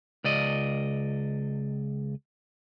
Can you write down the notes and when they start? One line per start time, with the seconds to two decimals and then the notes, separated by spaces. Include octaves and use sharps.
0.24 C#2 D5 D#5